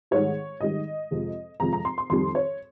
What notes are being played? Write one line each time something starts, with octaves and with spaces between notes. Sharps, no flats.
G#2 D#3 G3 C#5
G#2 D#3 G3 D#5
F2 C3 F3 G#3
F2 C3 F3 G#3 A#5
A#5
C6
C6
F2 D#3 G3 C6
C#5